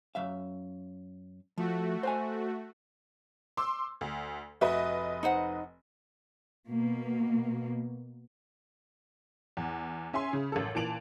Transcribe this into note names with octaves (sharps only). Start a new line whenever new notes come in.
F#2 E5 F5
F3 A3 F#4
C5 F#5 G#5
C6 D6 E6
D2
F1 F#4 B4 D#5 E5
D#4 C5 F#5
B2 A#3
E2
C#4 E5 G#5 C6
C#3
A1 F#2 A4
A#2 E3 A5 D7 F7 F#7